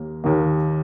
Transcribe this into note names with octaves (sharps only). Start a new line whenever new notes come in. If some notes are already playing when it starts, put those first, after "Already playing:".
Already playing: D#2 A#3
D#2 D#3 A#3